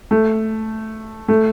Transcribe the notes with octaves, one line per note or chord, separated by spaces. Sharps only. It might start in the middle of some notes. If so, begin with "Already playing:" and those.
A3
A3